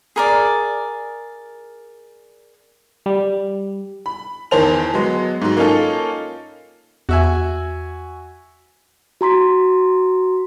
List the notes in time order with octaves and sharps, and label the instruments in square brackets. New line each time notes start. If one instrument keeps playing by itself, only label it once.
[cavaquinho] G#4 A#4 D5
[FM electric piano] G3
[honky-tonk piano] B5
E2 D#3 A#4 C5 A5 F7
F#3 G#3 B3
G#2 F#3
A#3 C#4 D#4 F4 A4
[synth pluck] E2 [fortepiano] F#4 E5 G#5
[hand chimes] F#4 A#5 C6 B6